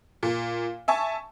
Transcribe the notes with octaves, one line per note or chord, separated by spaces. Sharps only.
A#2
E5 G#5 A5 C#6